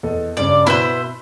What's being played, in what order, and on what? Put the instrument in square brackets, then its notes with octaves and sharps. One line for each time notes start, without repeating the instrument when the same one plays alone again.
[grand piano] E2 A4 D#5
[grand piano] G2 C#3 C#4 [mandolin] D5
[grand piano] B2 [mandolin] E4 B4 C5